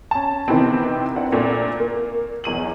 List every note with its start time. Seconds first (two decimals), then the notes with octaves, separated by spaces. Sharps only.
0.11 C#4 A5
0.48 C3 D#3 E3 B3 C4
1.15 C4 D4 E4 F#5
1.32 A#2 A3 C4 D4
1.80 A#3
2.44 B1 E2 D#7 F#7